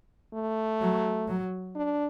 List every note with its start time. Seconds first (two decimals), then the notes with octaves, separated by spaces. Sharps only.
0.33 A3
0.81 F#3
1.28 F#3
1.75 D4